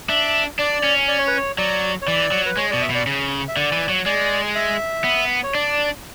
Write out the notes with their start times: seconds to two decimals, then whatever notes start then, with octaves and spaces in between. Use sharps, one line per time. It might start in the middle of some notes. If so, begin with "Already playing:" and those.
0.09 D4 E5
0.59 D4 D5
0.84 C#4
1.08 D5
1.18 C#5
1.28 B4
1.37 C#5
1.58 F#3 D5
2.02 C#5
2.07 E3 D5
2.32 F#3
2.46 B4
2.57 G#3 C#5
2.71 B2 D5
2.82 E5
2.90 B2 D5
3.07 C#3
3.48 E5
3.56 D3 D5
3.72 E3
3.89 F#3
4.06 G#3 D5
4.55 E5
5.04 B3
5.44 C#5
5.54 D4 D5